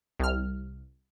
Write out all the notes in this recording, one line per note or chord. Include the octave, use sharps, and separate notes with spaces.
C2 F6